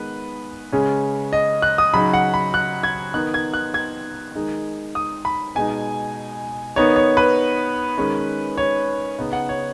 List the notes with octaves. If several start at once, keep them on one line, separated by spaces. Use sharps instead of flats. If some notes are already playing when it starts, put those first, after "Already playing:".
Already playing: D#3 G#3 B3 D#4 B4
C#3 G#3 C#4
D#5
F#6
D#6
C#3 F#3 D#4 B5
F#5
B5
F#6
G#6
D#3 B3 D#4 F#6
G#6
F#6
G#6
D#3 G#3 D#4
D#6
B5
B2 G#3 D#4 G#5
D#3 B3 D#4 C#5
C#5
B4
D#3 G#3 C#4
C#5
C#3 B3 D#4
F#5
C#5